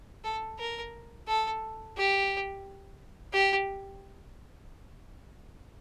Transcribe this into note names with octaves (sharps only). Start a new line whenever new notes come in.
A4
A#4
A4
G4
G4